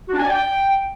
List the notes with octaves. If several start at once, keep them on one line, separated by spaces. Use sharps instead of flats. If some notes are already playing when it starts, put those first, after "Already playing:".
F#4
D4
G#5
D5
G5